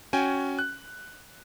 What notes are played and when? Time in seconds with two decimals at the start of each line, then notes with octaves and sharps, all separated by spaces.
0.13 C#4 F#4 G5 G#5
0.59 F#6